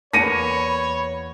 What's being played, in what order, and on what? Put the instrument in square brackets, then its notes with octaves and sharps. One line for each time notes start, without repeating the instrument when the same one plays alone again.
[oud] E2 A#3 [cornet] C#5 [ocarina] B5 [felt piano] A#6 C#7 D#7